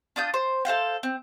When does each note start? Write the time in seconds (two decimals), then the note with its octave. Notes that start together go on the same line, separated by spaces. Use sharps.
0.16 D4 F4 D#6 G6
0.34 C5
0.65 A4 C5 F5 G5
1.03 C4